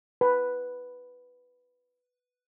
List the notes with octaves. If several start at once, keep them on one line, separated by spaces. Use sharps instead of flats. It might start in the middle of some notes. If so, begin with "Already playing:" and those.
B4